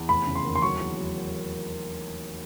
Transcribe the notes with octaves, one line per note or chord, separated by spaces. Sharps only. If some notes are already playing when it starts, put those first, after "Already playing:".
Already playing: E2
F1 B5
C#3
C6
D#2
C6
F#3 C#6
E2
F#3